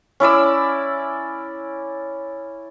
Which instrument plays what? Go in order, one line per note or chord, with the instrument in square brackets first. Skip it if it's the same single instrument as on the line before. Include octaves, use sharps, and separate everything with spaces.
[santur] C#4 E4 D5 E6